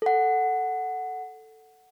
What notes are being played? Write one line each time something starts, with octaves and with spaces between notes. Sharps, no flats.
A4 F#5